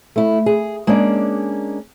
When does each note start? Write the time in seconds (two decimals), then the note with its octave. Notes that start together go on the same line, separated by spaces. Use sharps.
0.16 A3 E4
0.46 G#4
0.87 G#3 A#3 C#4 D4 D5